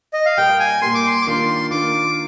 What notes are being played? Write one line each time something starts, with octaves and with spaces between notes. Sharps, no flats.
D#5
F5
A#2 G3 A#3 G5
G#5
A#2 G3 A#3 C6
D6
C6
D6
D#3 A#3 D4 F4 C6
D#3 A#3 D4 F4 D6